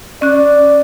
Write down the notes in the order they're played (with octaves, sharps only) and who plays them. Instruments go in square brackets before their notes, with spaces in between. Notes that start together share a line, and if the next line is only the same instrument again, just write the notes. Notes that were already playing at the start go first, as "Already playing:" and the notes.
[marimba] C#4 F#6 [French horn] D5